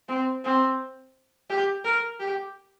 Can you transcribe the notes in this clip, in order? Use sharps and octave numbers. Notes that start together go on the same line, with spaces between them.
C4
C4
G4
A#4
G4